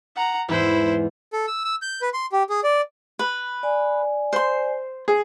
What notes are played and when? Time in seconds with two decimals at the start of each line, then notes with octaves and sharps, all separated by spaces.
0.16 F#5 A#5
0.48 E2 G#2 E4 C5
1.33 A4
1.47 E6
1.65 E6
1.82 G6
2.02 B4
2.14 C6
2.32 G4
2.50 G#4
2.63 D5
3.19 B4
3.63 D5 G#5
4.33 C5 C6
5.08 G#4